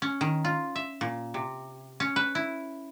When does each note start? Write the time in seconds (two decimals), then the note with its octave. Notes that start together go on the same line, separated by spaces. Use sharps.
0.02 C#4
0.21 D#3
0.45 F4
0.76 E5
1.01 A#2
1.34 C3
2.00 C#4
2.16 B4
2.35 E4